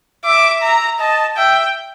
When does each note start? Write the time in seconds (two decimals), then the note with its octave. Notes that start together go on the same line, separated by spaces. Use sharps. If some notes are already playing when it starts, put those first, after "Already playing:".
0.25 E5 D6
0.63 A#5
0.99 D#5 A5
1.37 E5 G5